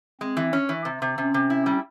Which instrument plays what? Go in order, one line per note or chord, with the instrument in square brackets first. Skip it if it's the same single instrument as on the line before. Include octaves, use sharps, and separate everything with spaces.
[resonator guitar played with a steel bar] G#3 [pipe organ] C4
[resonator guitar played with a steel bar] E3
C#4
E3
C3
C3
[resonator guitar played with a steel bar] C3 [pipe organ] C#4
[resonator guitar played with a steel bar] C3
E4
G3